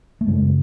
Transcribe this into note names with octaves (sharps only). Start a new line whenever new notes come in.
A3
F#2 C#3 G#3